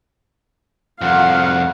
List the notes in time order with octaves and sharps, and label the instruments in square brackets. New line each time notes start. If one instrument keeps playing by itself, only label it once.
[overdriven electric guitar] C2 F2 [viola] F5 F#5